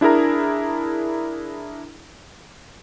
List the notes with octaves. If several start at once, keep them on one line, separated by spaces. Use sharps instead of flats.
D4 E4 G#4 A#4 A#5